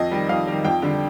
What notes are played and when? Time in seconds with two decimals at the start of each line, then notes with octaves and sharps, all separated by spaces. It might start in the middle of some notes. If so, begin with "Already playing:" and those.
Already playing: F2 D#5
0.11 D#3 G3
0.29 F2 F5
0.47 D#3 G3
0.65 F2 G5
0.82 D3 G3